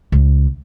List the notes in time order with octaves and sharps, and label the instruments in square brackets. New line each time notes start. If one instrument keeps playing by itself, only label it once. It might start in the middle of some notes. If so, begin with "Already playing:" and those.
[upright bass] C#2